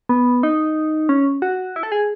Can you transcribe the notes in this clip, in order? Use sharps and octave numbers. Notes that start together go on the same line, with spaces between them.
B3
D#4
C#4
F#4
E4
A4
G#4